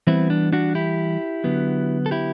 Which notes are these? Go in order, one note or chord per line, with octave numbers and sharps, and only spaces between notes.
E3 G3 B3 C4 E4
D4
D4 F#4
E4 G4
D3 F#3 B3
A4
E4 G4